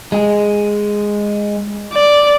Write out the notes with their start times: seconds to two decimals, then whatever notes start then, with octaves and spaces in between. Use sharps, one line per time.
0.12 G#3 G#4
1.93 D5